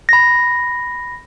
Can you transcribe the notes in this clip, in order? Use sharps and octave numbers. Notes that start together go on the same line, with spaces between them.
B5 A#6